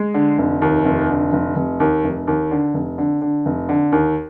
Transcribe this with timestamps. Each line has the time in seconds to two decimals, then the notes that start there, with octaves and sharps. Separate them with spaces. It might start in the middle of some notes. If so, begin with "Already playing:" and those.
Already playing: G#3
0.14 D3
0.38 F1
0.62 D#2
0.85 F1
1.09 D3
1.33 F1
1.56 F1
1.80 D#2
2.04 F1
2.27 D#2
2.51 D3
2.74 F1
2.98 D3
3.22 D3
3.46 F1
3.69 D3
3.92 D#2